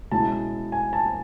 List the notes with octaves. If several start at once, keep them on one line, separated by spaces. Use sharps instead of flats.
B2 G#3 C#4 E4 A5
G#5
A5